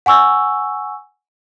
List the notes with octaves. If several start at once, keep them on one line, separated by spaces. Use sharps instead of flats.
F#5 G#5 C#6 E6